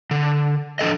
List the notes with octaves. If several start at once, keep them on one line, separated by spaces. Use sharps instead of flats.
D3
F3 D4 A4 D#5